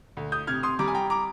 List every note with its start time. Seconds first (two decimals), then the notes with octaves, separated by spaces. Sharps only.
0.17 D2
0.32 D#6 G6
0.47 C3 F6 G#6
0.63 C6 D#6
0.79 G3 A#5 D6
0.88 G#5
0.95 G5 A#5
1.10 A#5 D6